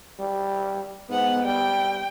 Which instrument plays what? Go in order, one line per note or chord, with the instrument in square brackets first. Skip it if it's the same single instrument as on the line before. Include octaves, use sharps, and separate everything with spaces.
[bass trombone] G3
[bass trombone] G#2 [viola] B3 F#5
[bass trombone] G3 [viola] G5